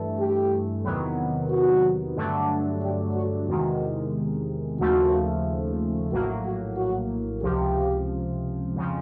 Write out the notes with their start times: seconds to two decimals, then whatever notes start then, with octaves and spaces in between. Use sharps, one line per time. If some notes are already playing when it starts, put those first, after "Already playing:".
Already playing: G2 E3 A3
0.19 G4
0.84 E2 C3 D#3 F#3 B3
1.51 F#4
2.16 G2 D3 F#3 A3 D4
2.82 G4
3.15 F#4
3.48 E2 C3 D#3 G#3 F#4
4.80 D#2 C#3 F3 A3 F#4
6.11 A#1 A2 F#3 A#3 F#4
6.45 F#4
6.77 F#4
7.43 C#2 C3 F3 G4
8.75 F2 C#3 F3